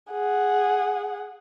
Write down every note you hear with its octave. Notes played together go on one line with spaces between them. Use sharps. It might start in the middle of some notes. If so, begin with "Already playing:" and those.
G#4 F#5